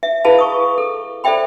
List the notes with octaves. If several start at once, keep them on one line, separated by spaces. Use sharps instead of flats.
E5
E4 G#4 B4 F5 A5 B5
C#6 D#6
A4
A4 C5 D5 E5 G5 B5